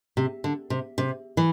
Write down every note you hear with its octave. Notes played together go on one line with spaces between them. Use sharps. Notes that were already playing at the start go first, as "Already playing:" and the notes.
C3
D3
C3
C3
E3